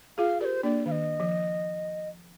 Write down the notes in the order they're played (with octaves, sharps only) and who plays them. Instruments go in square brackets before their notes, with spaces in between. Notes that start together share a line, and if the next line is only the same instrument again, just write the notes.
[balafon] F4 G#4 [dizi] F5
[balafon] G4 A#4 [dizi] D5
[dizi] C5
[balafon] A#3 D4 [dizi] D5
[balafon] D#3 [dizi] F5
[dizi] D#5
[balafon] F3